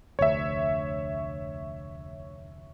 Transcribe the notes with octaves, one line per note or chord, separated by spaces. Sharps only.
F1 D2 C#5 E5